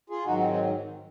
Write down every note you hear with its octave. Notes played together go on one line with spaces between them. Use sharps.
F4 G#4
G#2 D#3 F#3 D#4 F#4
C4 D#4
G#3 C4